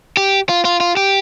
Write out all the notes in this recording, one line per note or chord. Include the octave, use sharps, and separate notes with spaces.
G4
F4
F4
F4
G4